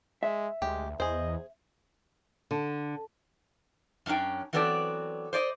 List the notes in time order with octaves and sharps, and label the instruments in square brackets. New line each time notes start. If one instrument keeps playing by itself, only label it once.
[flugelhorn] G#3 [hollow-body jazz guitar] E5
[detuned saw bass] D2 [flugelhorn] G#3 [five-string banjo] G4
[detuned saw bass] E2 [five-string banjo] G#4 C5 [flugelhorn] D#5
[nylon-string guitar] D3
[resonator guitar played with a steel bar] F#2 A2 C#4 D4 G5
E3 F#3 B3 C4 A4 D5
C5 D5 D#5